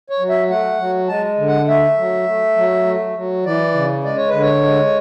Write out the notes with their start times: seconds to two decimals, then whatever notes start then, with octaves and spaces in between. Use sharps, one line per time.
0.10 C#5
0.19 F#3
0.29 E5
0.49 A3 F#5
0.79 F#3
1.08 G#3 A5
1.38 D3
1.48 F#5
1.68 A3 E5
1.98 F#3
2.27 A3
2.57 F#3
2.86 A3
3.16 F#3
3.45 E3 D5
3.74 C#3
4.04 G#3 D5
4.17 C#5
4.29 D3 B4
4.41 C#5
4.63 G#3